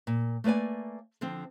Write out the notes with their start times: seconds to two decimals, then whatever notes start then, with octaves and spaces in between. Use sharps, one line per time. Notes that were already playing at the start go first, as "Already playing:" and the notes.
0.07 A#2
0.44 A3 A#3 B4 D5 G#5
1.21 D3 F3 C4